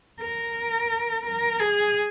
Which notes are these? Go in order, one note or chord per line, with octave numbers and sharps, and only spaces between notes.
A#4
A#4
G#4